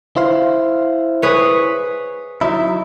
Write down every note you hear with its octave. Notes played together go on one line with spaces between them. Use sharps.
E4 C5 F5
G#4 B4 C#5
F#3 D#4 E4